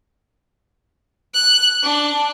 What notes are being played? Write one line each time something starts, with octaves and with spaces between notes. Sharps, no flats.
F#6
D4